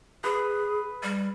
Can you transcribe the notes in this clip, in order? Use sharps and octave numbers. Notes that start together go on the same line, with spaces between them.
G#4 B4
G3